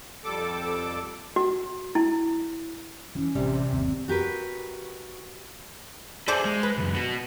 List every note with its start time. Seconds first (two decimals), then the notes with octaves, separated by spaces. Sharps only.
0.24 F2 G3 A4 D6
1.36 F#4
1.95 E4
3.15 E3 F3 C#4
3.35 A1 C3 G3
3.72 G1 D#2 C4
4.08 F#4 G4 A#4 B4
6.28 G#4 A4 C5 D5 E5
6.45 G#3
6.63 B4
6.78 C#2 F#2
6.95 B3 F#4